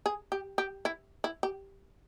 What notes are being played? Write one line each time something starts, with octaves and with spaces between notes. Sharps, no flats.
G#4
G4
G4
E4
E4
G4